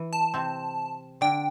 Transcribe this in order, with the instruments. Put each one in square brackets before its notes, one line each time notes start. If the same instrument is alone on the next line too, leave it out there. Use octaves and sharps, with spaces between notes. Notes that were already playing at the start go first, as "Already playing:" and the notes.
Already playing: [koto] E3
[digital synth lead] A5
[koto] C3 C4
[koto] D3 D4 [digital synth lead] G5